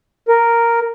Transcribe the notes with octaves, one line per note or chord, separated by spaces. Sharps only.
A#4